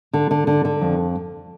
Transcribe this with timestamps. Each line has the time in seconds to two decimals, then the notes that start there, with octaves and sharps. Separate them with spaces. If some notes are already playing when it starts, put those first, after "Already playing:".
0.13 D3
0.31 D3
0.47 D3
0.65 D3
0.81 F2